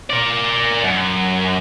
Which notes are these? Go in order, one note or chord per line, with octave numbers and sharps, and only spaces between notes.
A#4 D5
F#2